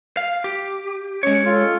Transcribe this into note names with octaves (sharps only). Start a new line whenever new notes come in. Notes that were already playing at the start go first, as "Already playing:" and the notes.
F5
G4
G#3 C#4 C#5
F4 A4